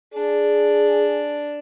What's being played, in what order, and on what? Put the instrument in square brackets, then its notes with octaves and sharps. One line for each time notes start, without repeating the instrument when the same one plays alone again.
[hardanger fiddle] D4 [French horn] G#4